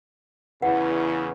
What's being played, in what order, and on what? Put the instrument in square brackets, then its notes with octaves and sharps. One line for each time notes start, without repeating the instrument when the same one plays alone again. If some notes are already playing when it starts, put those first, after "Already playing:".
[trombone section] E2 C#3 [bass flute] E4 [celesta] B4 [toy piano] F#5